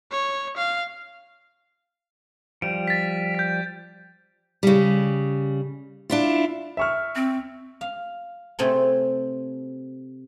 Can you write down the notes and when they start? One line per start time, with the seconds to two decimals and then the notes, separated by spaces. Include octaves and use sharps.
0.12 C#5
0.57 F5
2.62 F3 G3 D7
2.88 A6 B6
3.35 G6 B6
4.63 C#3 G3
6.10 D4 E4 F4
6.77 E5 C#6 F6
7.15 C4
7.81 F5
8.59 C3 A3 C4 G#4 A4